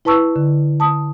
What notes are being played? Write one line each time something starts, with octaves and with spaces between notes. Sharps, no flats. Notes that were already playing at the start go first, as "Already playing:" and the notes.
E4 B4 A5 C#6 E6
D3
A5 D#6